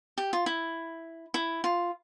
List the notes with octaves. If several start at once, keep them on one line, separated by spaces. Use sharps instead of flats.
G4
F4
E4
E4
F4